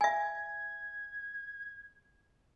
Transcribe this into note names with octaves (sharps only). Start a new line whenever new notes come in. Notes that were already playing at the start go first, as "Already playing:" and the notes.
E5 G#5 G#6